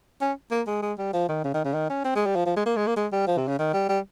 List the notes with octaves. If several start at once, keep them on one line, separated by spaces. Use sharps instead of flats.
C#4
A#3
G#3
G#3
G3
F3
D#3
C#3
D#3
C#3
D#3
C#4
C4
G#3
G3
F3
F3
G#3
A#3
G#3
A#3
G#3
G3
F3
C3
C#3
D#3
G3
G3